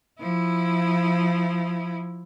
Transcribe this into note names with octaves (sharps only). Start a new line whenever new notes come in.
F3 E4